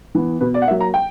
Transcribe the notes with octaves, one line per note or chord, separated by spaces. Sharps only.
E3 B3
B2 B4
D5
F#5
F#3 A#3 E5
A#5
G5